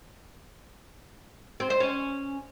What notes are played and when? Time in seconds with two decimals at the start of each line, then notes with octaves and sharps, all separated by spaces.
1.60 C4
1.70 C5
1.80 C#4